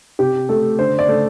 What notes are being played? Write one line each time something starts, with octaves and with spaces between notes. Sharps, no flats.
C3 G4
A3 A4
D3 C5
D5
A3